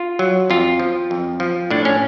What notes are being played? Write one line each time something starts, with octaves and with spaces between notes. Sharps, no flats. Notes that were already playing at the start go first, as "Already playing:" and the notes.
Already playing: F4
F#3
F2 F4
F3
F2
F3
A2 D4
C#4